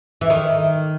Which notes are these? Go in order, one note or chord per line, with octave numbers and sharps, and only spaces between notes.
E3
D#3